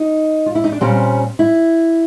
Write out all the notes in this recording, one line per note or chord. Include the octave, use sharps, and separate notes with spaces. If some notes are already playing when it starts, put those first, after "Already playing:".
Already playing: D#4
F4
E4
D#4
D4
A#2 G3 C4 C#4
E4